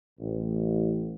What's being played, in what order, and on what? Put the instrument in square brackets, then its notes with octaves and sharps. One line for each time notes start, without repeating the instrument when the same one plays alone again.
[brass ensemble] A1